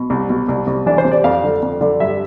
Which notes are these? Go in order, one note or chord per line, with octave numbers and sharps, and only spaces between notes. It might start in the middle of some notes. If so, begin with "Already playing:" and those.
Already playing: B2
C2
B2
C2
C2
E3 D4
C5
C3
D5
F2 F5
D3
F2
D3
G2 E5